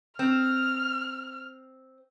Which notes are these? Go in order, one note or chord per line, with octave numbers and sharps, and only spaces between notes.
C4 F6